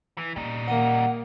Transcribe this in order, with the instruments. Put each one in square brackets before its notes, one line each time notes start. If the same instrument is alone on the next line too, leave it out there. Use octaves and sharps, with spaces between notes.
[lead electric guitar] E3
[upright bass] A#2 [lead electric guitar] G3 D#4
[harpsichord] A#3 D#5 [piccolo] F#5